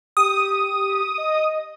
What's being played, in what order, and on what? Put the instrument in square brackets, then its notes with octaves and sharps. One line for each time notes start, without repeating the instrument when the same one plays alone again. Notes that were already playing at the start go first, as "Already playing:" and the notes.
[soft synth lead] G4 [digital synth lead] D#6
[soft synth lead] D#5